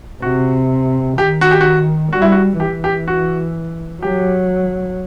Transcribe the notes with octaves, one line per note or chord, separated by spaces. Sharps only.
C3 F#4
D#3 G4
F#4
G4
F#4
G3 F#4
E4
F#4
E3 G4
G4
F#4
F#3 G4